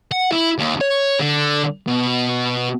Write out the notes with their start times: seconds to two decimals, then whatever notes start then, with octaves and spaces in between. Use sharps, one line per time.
0.12 F#5
0.32 E4
0.58 D#2
0.81 C#5
1.19 D3
1.87 B2